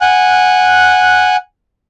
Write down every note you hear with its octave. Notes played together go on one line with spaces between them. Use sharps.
F#5 G#5 F#6